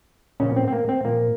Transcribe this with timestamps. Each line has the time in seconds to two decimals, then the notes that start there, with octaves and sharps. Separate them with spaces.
0.40 A#2 C#3 C#4
0.45 F3
0.56 C4
0.68 C4
0.73 A#3
0.89 C4
1.05 A#2 F3 A#3